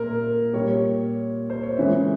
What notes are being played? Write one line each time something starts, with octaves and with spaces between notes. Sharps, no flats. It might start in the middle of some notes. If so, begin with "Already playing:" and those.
Already playing: A#2 A#4
A#2 G3 C#5
C5
C#5
C#3 E3 G#3 E5